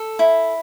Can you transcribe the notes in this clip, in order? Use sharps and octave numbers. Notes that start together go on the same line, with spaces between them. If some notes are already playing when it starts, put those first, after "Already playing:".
Already playing: A4
E4